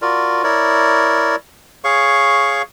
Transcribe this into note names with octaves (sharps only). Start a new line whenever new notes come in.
F4 F#4 A#4 D5
E4 A#4 C#5 D5
G#4 C#5 F5 C#6